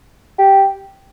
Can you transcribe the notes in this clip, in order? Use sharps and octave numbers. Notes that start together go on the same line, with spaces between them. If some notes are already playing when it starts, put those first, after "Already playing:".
G4